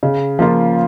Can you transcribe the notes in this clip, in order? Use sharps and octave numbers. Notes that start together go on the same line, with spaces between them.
C#3
F3 A#3 F4